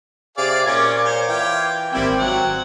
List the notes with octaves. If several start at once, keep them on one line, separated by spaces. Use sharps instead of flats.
C3 G#4 D5 F5
A#2 C#4 D6 G#6
C5 C#5
E3 F4 G5
G#1 G3 A#3 C4 E4 G5
F#3 F#5